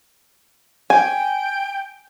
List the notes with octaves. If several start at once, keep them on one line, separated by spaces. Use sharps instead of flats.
G5 G#5